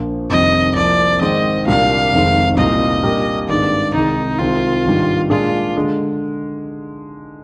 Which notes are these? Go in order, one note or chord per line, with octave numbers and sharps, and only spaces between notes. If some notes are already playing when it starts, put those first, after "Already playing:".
Already playing: A#1 A#2 F3 A#3
F1 F2 C3 D#3 G3 D#5
C2 C3 F3 A#3 D5
G#2 D#3 G#3 C4 D#5
C2 A#2 G3 A#3 D4 F5
F1 F2 C3 D#3 G#3
C2 A#2 G3 A#3 D#4 D#5
A#2 G3 D4 G4 A#4
G#1 G2 D#3 G#3 D5
C2 C3 D#3 G#3 D#4
C2 C3 D#3 G#3 C4 F4
G#1 G2 D#3 G3
A#2 G#3 D4 F4 G#4
D3 G#3